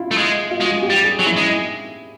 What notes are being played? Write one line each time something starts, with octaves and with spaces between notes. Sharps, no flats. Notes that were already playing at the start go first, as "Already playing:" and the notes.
Already playing: E4 F4
A3
G#3
F4
G#3 F#4
G4
G3
G#4
F#3
E4
G#3